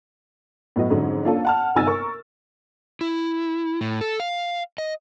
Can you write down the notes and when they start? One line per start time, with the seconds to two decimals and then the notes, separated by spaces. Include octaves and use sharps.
0.76 A2 F#3 B3 D#5
0.90 F2 G#2 D3 F#3 C#4 D#4
1.25 A#3 C#4 D4 F4 A4
1.45 F#5 A5 F6
1.75 G1 C3 D#4 G#5 E6 A6
1.87 A#4 C#6
3.01 E4
3.81 A2
4.01 A4
4.20 F5
4.78 D#5